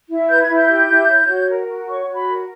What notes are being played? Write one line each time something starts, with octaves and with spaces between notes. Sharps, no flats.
E4
B4 G6
G#6
E4
G6
G4
E4
C#5
F#4
A#4
F#4
C#5 C#6
F#4
B5
A#4